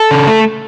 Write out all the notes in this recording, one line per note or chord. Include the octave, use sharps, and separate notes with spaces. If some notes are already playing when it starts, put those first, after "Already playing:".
Already playing: A4
C#3
A3